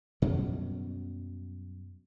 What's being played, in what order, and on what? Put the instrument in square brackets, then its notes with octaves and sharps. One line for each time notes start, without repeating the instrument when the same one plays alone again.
[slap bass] F#2 B2 F#3 G3